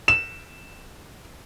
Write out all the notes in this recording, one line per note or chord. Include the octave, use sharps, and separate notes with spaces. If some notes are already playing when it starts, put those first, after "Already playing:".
E7